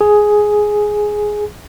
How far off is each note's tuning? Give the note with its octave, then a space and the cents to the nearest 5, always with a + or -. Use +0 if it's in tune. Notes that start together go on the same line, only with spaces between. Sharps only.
G#4 +5